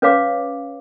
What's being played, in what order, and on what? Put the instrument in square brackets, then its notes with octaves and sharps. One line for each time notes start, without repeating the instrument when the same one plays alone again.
[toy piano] C#4 B4 C#5 F5 D6